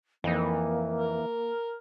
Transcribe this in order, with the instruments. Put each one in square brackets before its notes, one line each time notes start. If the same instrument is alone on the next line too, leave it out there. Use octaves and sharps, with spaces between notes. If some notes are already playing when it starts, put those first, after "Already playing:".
[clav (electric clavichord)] F2 D#4 [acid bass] E3 [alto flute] A#3
[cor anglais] A#4